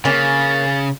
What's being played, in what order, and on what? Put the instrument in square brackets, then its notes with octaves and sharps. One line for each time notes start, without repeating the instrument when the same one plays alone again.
[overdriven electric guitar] C#3 [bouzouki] A#3 C#4 [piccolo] A6